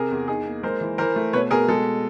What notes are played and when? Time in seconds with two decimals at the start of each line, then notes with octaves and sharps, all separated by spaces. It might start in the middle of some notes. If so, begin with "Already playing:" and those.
Already playing: C3 G#4 A#4
0.11 E2
0.28 D#4 G#4
0.45 A#3
0.63 G#3 A#4 C5
0.81 E3
0.98 E3 A#4 C5
1.16 A3
1.33 B2 B4 C#5
1.50 B2 G#4 A#4
1.68 G#3 A4